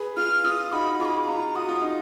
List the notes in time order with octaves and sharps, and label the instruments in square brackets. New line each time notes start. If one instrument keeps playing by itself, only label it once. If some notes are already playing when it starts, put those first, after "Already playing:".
Already playing: [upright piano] G#4 B4
[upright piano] F4 G#4 [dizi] F6
[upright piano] F4 [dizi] D#6
[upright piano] D#4 F#4 [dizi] B5
[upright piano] F4 G#4 [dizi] D6
[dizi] B5
[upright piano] F4 [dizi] A#5
[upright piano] F#4 [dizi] D#6
[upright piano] F4
D#4